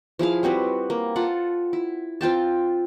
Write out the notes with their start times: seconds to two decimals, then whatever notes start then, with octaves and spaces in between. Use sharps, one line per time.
0.19 F3 E4 G#4 F5
0.43 G3 C4 F#4 B4
0.90 A#3
1.16 F4 A4 F#5
1.73 E4
2.21 C4 F4 G5 A5